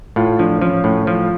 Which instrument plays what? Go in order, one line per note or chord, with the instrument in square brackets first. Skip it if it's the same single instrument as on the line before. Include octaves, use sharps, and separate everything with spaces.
[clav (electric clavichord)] A2 [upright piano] F4
[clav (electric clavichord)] F3 [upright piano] D4
[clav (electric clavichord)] F3 [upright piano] C#4
[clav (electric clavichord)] A2 [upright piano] C#4
[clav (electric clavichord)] F3 [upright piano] F4